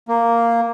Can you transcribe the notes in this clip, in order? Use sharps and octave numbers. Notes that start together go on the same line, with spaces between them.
A#3